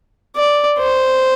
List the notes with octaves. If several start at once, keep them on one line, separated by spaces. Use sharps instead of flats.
D5
C5